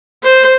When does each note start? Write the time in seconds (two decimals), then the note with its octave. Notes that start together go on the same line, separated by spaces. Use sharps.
0.23 C5